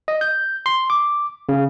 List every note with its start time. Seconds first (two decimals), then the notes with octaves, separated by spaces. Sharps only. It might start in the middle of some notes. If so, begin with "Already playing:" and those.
0.08 D#5
0.21 G6
0.66 C6
0.90 D6
1.49 C#3